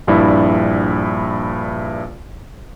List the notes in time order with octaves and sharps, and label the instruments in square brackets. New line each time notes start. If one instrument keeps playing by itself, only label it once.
[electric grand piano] A#1 G2 E4 D5